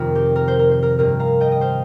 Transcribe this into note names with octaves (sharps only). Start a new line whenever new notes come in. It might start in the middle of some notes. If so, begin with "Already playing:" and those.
Already playing: F2 C3 D#3 C4 D#4 A#4
G4
A#4
C5
A#4
C5
A#4
G2 D#3 C4 D#4 A#4
F5 A#5
D#5 G5
D#5
C5 F5